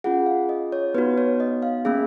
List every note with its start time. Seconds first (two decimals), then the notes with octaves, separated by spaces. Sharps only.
0.04 C#4 F4 G#4 F#5
0.26 F5
0.49 D#5
0.72 C#5
0.94 B3 D#4 F#4 B4
1.18 C#5
1.40 D#5
1.62 F5
1.85 A#3 C#4 G#4 F5